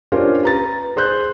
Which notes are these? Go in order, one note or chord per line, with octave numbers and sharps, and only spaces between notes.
C#4 D4 F4 G4 A#4 C5
B4 A#5 A6
G#4 C5 C6 F#6 G6